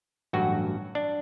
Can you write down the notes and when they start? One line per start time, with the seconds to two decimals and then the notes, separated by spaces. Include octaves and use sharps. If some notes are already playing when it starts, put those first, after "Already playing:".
0.33 A1 G2 F#3 F#4
0.95 D4